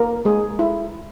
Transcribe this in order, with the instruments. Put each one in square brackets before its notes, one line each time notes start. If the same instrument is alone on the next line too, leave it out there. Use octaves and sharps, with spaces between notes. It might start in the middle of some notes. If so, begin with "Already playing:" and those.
Already playing: [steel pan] A#3 A#4
G#3 G#4
E4